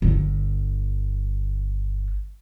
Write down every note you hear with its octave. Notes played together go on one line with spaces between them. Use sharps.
G1 D3